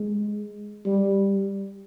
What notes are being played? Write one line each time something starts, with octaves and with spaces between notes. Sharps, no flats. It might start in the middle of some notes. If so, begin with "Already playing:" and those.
Already playing: G#3
G3